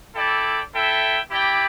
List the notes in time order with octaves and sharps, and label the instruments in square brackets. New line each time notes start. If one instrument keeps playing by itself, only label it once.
[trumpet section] E4 A4 D5 G5
E4 A4 E5 G5
E4 G4 D5 G5